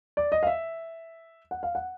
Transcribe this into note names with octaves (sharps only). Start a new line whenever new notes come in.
D5
D#5
F5
E5
F#5
F5
F#5